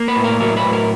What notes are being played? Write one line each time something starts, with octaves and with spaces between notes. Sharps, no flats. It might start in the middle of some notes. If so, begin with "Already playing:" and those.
Already playing: A#3
B4
A2
A#4
F#3 A#4
B4
A2
A#4